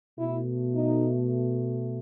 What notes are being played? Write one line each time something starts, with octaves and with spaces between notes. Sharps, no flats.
B2 A3 E4
D#4